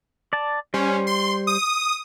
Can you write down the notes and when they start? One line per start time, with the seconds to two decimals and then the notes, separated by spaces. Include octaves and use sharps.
0.33 D5 A5
0.74 G3 C#4 C5
1.07 C6
1.47 D#6